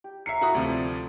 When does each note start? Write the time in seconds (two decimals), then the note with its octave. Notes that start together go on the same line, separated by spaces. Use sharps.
0.04 G4
0.26 A#4 C#5 E5 A#5 C7 C#7
0.41 E4 F#4 D#6
0.55 D2 C3 F3 D5 B5